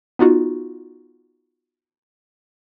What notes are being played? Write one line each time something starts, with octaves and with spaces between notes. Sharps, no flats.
B3 D#4 F4 F#4